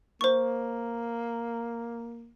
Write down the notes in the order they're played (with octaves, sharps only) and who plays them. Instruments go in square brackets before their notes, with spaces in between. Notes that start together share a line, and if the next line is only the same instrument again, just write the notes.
[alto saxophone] A#3 [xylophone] C5 C#6